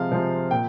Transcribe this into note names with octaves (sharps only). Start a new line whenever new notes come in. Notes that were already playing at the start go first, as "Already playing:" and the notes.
Already playing: C3 F3 G#3 F5
C3 F3 G#3
A#2 G5